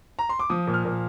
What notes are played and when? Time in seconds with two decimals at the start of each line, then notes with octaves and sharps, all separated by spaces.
0.19 A#5
0.29 C6
0.39 D6
0.50 F3 D#6
0.67 A#2
0.74 F6
0.85 A#2